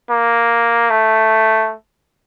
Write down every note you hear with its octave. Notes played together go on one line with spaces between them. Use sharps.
A#3
A3